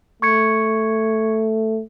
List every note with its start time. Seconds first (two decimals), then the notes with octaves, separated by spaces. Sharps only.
0.22 A3 C#6 G#6 C#7